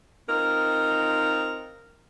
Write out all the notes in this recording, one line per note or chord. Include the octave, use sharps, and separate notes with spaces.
C4 D#4 F4 A#4